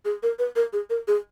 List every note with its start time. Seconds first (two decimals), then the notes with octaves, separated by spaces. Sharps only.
0.05 G#4
0.23 A#4
0.39 B4
0.56 A#4
0.73 G#4
0.90 A#4
1.08 G#4